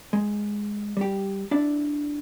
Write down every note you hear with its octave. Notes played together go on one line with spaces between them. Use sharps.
G#3
G3 G4
D4 E4 D5